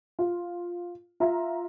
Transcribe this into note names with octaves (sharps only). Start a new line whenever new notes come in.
F4
F4 E5 A#5